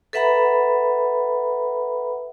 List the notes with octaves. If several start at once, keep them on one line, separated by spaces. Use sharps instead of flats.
A4 B4 E5 F#5 A#5 B5